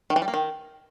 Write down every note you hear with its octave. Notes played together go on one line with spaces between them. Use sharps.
D#3
E3
G3
A#3
D#3